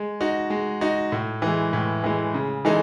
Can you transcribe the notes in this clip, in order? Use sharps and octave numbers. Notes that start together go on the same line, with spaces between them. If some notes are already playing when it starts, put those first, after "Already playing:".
Already playing: G#3
D#4 F#4
G#3
D#4 F#4
A2
E3 G#3
A2
E3 G#3
C#3
E3 G#3 D#4 A4